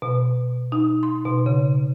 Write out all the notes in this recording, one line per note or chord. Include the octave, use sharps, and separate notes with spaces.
B2
D#4
C6
B2
C#3